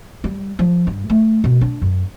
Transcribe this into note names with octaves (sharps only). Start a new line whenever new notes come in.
G3
F3
G2
A3
B2
D4
F#2